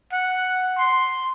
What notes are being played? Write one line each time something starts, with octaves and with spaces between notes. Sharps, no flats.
F#5
C6